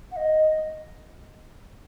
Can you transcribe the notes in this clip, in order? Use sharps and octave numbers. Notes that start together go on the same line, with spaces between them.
F#5
D#5